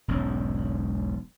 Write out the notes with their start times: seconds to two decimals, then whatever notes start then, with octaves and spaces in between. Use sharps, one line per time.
0.08 E1 B1 G#2 C#4